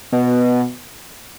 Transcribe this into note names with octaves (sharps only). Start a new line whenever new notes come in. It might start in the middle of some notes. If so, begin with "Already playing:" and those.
B2